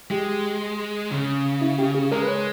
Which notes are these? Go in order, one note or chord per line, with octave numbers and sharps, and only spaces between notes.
G#3 G4
C#3
E4
G4
G#4
G#3 A#4
B4
C#5